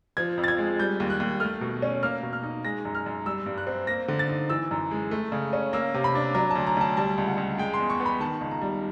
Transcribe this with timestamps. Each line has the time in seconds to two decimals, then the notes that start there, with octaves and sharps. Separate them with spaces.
0.17 F3 G#6
0.38 F2
0.44 A6
0.48 G#6
0.58 G#3
0.79 G3 G6
1.00 D#2
1.10 F#6
1.20 D#2
1.40 A3 F6
1.61 B2
1.82 C#4
2.03 A#3 F6
2.23 B2
2.33 F6
2.43 D#4
2.65 G#3 A#6
2.85 F#2
2.95 F6
3.06 F#2
3.26 G3 E6
3.46 G2
3.58 F#6
3.67 C4
3.87 A#3 A#6
4.08 D3
4.19 A6
4.29 D#4
4.49 E3 E6
4.71 F#2
4.91 G#3
5.11 A3
5.32 C#3
5.53 C#4
5.73 A#3 E6
5.94 C3
6.04 B5
6.15 D4
6.35 F#3 A#5
6.50 D2 A5
6.67 A#5
6.77 D2 A5
6.97 G3 A5
7.18 C#2
7.28 F#5
7.38 C#2
7.58 G#3 G5
7.74 C6
7.79 E2
7.90 C#6
8.00 B3
8.06 B5
8.20 D#3 A5
8.41 C#2
8.51 A#5
8.61 G3